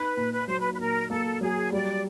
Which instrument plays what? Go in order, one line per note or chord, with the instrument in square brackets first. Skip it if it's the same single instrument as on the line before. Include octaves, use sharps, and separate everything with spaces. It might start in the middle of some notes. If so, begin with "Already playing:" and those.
Already playing: [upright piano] D#4 [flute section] B4
[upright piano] A#2
[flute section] B4
[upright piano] F#3 [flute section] C5
[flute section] B4
B4
[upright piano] A#2 [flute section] A#4
[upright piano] A#3 [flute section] A4
[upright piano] F#3 [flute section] G#4
[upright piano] G3 [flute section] D5